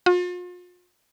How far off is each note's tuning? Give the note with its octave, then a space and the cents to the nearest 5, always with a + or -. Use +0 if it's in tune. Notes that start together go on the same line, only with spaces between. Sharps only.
F4 +40